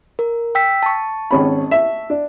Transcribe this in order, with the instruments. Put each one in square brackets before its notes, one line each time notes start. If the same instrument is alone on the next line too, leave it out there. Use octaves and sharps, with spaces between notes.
[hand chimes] A#4
G5 E6 B6
A5 C#6
[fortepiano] G#1 C#4 B5
E5
D4